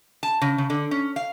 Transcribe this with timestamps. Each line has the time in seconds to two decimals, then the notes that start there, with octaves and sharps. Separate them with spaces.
0.23 A5
0.42 C#3
0.58 C#3
0.70 D3
0.91 C#4
1.16 F5